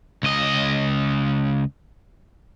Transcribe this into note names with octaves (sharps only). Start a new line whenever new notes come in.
C#2 D#5